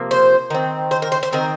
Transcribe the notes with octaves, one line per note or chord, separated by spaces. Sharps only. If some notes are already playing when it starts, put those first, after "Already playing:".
Already playing: C3 F3 A#3
C5
D#3 C4
C5
A#4
C5
C5
D#3 C4 A#4